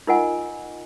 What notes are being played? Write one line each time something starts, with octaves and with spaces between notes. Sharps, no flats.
D#4 F4 A#4 D#5 F#5 G#5